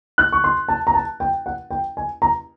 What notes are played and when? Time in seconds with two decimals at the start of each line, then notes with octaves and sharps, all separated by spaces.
0.18 F#6
0.32 C#6
0.44 C6
0.68 A5
0.87 A#5
0.94 A5
1.20 G5
1.46 F#5
1.71 G5
1.97 G#5
2.22 A#5